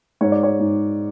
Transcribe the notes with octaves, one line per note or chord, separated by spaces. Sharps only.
G#2 C#5
D5
C#5
G#2